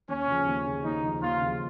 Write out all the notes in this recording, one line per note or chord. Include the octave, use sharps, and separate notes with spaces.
D#2 C#4
C#3 F3
D#2
C#3 F3
D#2 D#4
C#3 F3
D#2 F4
C#3 F3